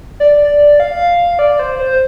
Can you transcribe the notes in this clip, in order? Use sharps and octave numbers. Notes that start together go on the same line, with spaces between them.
D5
F5
D5
C5
C5